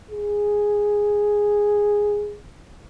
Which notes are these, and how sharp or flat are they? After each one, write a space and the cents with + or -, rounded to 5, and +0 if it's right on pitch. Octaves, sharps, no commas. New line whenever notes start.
G#4 -5